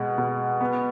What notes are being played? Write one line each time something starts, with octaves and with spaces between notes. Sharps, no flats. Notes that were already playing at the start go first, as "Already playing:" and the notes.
Already playing: B2 G#3
B2
B3